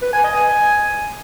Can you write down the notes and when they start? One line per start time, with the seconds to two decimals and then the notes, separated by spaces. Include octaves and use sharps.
0.02 B4
0.13 G#5
0.24 D#5
0.35 G#5